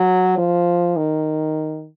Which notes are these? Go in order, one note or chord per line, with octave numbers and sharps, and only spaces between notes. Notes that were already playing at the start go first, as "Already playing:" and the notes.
Already playing: F#3
F3
D#3